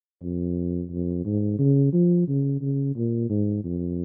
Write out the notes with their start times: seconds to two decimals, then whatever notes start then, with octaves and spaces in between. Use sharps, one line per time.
0.23 F2
0.90 F2
1.25 G#2
1.59 C#3
1.93 F3
2.28 C#3
2.61 C#3
2.96 A#2
3.29 G#2
3.64 F2